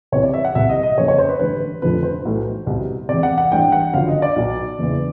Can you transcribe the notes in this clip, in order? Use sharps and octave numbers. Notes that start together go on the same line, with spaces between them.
C2 C3 E3 C#5
D5
E5
F#5
C2 C3 E3 E5
D#5
D#5
F#1 F2 C#3 C#5
C#5
C5
B4
A1 G2 D3 B4
F1 F2 D3 F3 B4
C5
B1 A2 E3
C2 B2
E1 E2 C3 D5
F#5
F#5
A1 G2 E3 G5
F#5
G1 F#2 D3 F3 F5
D#5
D5
B1 B2
F#1 E2 C#3 E3